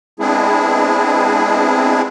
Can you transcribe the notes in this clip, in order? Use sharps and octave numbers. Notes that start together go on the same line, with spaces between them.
G#3 B3 C4 D4 E4 G#4